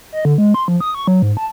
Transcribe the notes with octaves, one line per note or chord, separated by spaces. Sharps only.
D#5
D3
G#3
C6
F3
D#6
C#6
F#3
G#2
A5